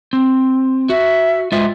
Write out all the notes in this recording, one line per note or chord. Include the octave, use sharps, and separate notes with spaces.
C4
F#4 E5
G#3 F4 E5